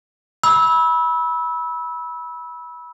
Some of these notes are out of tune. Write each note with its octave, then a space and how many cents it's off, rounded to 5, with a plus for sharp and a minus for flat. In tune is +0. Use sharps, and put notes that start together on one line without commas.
B5 -20 E6 -20